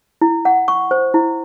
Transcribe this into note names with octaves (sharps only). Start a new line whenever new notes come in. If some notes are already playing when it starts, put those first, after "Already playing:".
E4
F#5
C#6
C5
E4